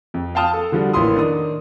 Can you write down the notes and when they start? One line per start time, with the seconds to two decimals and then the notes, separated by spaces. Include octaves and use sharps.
0.14 F2
0.35 F5 G5 A5 D#6 F6
0.54 A4
0.72 D3 F3 G3 F#4
0.93 A1 A#3 E4 C6 D#6
1.16 D#3 D4 D#6